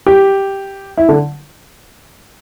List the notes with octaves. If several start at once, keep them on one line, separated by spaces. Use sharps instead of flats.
G4
E4
D3